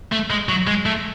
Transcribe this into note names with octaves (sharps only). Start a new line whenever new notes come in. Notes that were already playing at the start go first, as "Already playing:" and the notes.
A3
G#3
F#3
G#3
A3